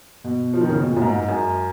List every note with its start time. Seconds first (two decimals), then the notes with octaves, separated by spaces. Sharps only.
0.24 B2
0.53 F3
0.61 D#3
0.69 C#3
0.76 B2
0.89 A#2
0.96 F#2
1.02 G#2
1.15 G#2
1.28 F#2